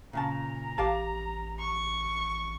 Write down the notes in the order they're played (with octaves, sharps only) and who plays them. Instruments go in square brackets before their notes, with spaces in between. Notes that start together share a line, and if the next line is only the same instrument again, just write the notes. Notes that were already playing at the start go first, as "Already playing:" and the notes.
[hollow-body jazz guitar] A#2 C#3 A5 [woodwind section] A#5
[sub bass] A1 [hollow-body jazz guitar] G4 F5 A5
[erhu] C#6